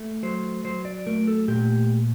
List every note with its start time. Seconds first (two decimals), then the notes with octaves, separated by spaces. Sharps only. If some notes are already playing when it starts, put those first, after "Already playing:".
Already playing: A3
0.23 F#3 C5
0.65 F#3 C5
0.85 D5
1.06 A3 A#4
1.28 A4
1.48 A#2 G4